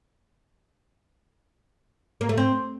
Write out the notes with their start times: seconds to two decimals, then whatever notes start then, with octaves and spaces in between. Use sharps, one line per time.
2.21 A#3
2.29 A3
2.38 C4